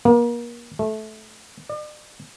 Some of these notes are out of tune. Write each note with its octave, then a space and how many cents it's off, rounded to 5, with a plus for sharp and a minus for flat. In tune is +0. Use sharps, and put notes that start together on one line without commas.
A#3 +35
A3 -20
D5 +45